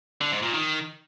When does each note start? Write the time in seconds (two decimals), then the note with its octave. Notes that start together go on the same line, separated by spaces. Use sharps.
0.21 D3
0.32 G#2
0.43 A#2
0.53 D#3